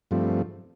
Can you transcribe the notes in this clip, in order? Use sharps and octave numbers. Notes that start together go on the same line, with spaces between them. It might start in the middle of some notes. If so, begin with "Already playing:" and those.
G2 F3 A3 C4